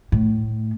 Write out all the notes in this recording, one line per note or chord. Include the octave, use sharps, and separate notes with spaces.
A2